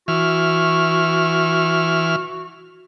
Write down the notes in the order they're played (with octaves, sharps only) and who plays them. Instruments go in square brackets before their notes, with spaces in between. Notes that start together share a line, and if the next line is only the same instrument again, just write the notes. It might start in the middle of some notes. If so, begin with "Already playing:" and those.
[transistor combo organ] E3 F6 [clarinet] F#4